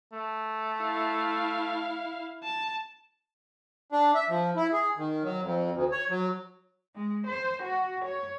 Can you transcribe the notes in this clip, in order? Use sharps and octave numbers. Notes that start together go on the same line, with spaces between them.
A3
E4 F5
A5
D4
E5
F3
E4
G#4
D#3
F#3
F2
D2
C#5
F#3
G#3
C5
F#4
C#5